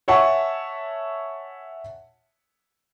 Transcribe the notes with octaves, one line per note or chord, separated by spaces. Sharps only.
C#5 E5 F#5 G#5 A5 C#6